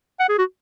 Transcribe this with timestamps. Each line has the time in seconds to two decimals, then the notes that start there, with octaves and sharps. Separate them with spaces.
0.20 F#5
0.29 G#4
0.39 F#4